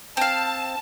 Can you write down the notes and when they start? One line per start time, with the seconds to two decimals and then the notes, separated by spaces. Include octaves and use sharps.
0.17 C4 F5 A5